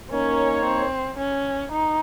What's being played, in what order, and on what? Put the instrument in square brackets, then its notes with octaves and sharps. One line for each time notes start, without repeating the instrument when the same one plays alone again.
[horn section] A#3 D#4 A#4 C#5 [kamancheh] C#4
[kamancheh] C4
C#4
D#4